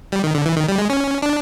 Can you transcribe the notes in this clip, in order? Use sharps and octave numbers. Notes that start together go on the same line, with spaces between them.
G3
D#3
D3
E3
D#3
G3
G#3
C#4
D4